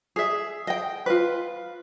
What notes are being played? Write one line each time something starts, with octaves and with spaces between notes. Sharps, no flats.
G#4 E5
D#5 G5
F4 B4